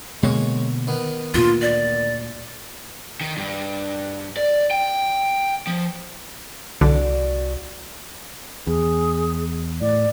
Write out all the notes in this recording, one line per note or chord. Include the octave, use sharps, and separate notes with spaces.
B2 D3 G#3 A#3 C#5
D#3 B3
D2 A#2 F4
D5
D#3
G2
D5
G5
F3
C2 D3 F#4 D5
E2 G#4
A2 D5